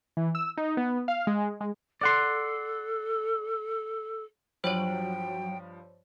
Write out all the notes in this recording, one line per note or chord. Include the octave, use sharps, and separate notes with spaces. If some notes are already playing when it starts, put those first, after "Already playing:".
E3
E6
D#4
B3
F5
G#3
G#3
A4 D5 F#5 C6
G2 F3 F#3 C5 C#5 G5 B5